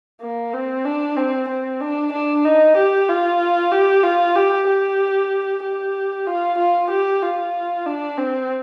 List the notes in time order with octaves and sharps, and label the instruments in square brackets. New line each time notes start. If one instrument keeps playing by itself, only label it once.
[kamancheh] A#3
C4
D4
C4
C4
D4
D4
D#4
G4
F4
G4
F4
G4
G4
G4
F4
F4
G4
F4
D4
C4